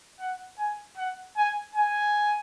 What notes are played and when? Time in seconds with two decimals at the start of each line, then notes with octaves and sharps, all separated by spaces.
0.20 F#5
0.58 G#5
0.97 F#5
1.37 G#5
1.75 G#5